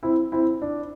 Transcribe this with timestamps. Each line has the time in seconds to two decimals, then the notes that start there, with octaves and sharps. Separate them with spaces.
0.03 C4 E4
0.32 C4 E4
0.62 D4